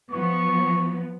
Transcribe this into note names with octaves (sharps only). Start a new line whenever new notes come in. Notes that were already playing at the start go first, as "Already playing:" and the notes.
F3 B3 C#6